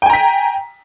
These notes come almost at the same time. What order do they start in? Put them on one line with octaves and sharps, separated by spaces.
G5 G#5 A#5 B6